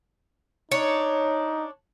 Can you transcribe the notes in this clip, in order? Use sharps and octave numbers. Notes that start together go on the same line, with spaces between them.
D4 D#4 C#5